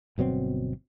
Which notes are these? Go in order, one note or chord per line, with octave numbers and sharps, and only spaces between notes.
G1 B2 F#3 C4